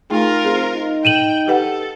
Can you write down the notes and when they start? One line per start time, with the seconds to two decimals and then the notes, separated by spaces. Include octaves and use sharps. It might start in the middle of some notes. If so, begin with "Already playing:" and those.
0.10 A3 D#4 F4 G#4 A#4 G5
0.45 C4 G#4
0.75 D#4
1.05 G5 D#7 E7 F#7
1.48 G4 A4 B4 F#5